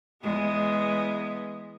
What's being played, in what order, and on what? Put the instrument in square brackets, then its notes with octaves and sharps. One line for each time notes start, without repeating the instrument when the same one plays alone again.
[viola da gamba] E2 G#3 B3